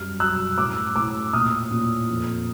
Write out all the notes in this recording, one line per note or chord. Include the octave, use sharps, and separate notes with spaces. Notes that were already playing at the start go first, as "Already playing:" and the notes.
Already playing: F#2 G3 F6
F#3 E6 F#6
A2 D6 E6
A2 D6 E6
A#2 D#6 F6
A#2
F2